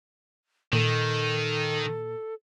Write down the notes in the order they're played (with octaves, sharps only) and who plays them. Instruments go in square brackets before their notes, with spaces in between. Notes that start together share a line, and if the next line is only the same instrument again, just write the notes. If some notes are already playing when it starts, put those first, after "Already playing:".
[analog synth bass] A#2 [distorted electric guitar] D#3 [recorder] A4